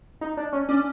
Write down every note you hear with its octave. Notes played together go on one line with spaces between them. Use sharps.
D#4
D4
C#4
C#4 D4